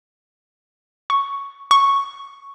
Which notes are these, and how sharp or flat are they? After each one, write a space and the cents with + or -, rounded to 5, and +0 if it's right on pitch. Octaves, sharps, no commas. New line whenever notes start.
C#6 +5
C#6 +0